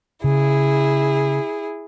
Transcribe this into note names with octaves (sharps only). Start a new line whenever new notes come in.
C#3 E4 G#4